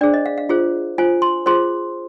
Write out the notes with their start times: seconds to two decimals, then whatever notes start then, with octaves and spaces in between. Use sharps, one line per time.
0.01 D4 G#4 C5 D5
0.14 D#5
0.26 F5
0.38 F5
0.49 F4 G#4 C5
0.98 F4 C5 G#5
1.22 C6
1.46 F4 G#4 C5 C6